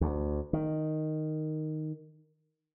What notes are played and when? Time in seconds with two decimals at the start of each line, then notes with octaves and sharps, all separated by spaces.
0.01 D2
0.53 D#3